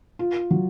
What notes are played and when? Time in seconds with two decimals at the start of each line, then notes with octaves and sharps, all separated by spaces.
0.19 F4
0.51 F#3